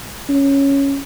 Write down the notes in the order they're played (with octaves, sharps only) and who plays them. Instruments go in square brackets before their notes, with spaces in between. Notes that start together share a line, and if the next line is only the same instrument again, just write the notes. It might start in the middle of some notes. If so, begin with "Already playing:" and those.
[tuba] C#4